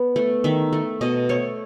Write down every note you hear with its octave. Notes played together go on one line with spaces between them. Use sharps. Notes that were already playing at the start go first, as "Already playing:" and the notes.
Already playing: B3
A3
D#3 E5
A3
B2 D#5
A3 C#5